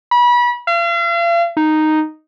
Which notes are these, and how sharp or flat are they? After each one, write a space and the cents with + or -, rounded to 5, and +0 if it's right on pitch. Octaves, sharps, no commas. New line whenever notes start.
B5 -30
F5 -40
D#4 -5